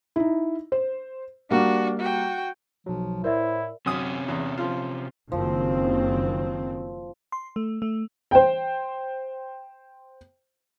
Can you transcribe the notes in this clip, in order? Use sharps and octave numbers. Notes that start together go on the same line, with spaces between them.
D#4 E4
C5
G3 A#3 D4 F#4
F#4 G5
B1 F3 F#3
A2 E4 A#4 C5 D5 E5
F#2 C3 C#4 D#6
E2
F3 F4
F#1 D#3 F3 C4
C6
A3
A3
C5 G5